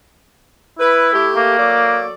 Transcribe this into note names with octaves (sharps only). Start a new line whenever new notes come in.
E4 B4
A3 G4
A#3
F#3 A4 D5